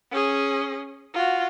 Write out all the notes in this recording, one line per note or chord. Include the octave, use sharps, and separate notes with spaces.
C#4 G#4
F4 F#4